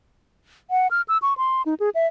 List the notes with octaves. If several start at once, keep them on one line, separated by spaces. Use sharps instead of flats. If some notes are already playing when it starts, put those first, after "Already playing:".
F#5
F6
E6
C#6
C6
D#4
G#4
E5